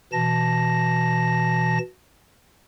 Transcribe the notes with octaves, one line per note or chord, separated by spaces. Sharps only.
B2 E3 A5 A#6